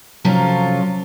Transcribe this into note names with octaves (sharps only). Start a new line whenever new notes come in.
C3 F3 F#3 C#4 F4 A4